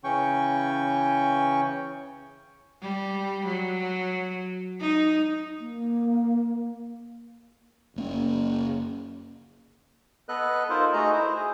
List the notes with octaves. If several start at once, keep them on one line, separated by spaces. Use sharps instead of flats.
C#3 E3 C#4 G5 C#6
G3
F#3
D#4
A#3
F#1 A#3 C#4
B3 A4 B4 D#5 F#6
D#4 F4 A4 A#4 C5
A3 D#4 F#4 G#4 D#5 A#5
E4 C5
G#4